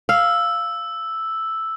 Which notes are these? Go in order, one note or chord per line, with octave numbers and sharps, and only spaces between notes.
F5 E6